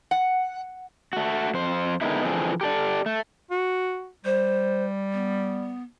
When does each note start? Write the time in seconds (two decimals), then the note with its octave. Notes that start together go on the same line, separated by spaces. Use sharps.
0.11 F#5
1.13 A3 F#4
1.54 F2 C5
2.01 D3 D#3 G#3 B3 D#4 E4
2.25 D3 E3 F3 C4 G#4
2.61 G4 A4 D5
3.06 A3
3.51 F#4
4.25 G3 C5
5.13 B3